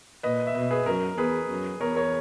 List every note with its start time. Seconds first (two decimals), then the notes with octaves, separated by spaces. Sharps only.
0.23 A#2 B4 D#5
0.47 E5
0.55 B2 B4 D#5
0.71 G#4 B4
0.86 F#2 A#4
1.18 E2 G#4 B4
1.49 F#2
1.80 E2 A#4 C#5
1.96 A#4 C#5